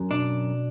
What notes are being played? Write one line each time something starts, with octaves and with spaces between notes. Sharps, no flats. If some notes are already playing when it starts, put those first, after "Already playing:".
Already playing: F#2
B2 D4